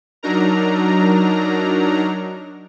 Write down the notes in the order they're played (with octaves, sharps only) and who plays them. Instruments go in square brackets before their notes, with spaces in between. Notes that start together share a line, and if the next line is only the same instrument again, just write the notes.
[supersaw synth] F#3 D4 D#4 A#4 A#5